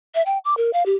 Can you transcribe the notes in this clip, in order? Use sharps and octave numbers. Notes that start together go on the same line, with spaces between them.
E5
G5
D6
A#4
F5
G4